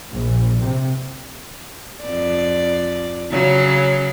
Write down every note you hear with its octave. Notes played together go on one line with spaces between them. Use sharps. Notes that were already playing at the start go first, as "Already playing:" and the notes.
A#1
C3
F2 D5
C#3 F#3